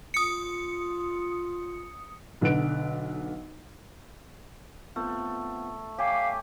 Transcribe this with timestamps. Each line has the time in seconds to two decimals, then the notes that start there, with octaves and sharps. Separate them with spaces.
0.14 F4 D#6 C#7
2.41 B1 D3 B4 F#6 D7
4.96 A3 B3 C4 F4
5.98 G4 C#5 F5 G#5 D6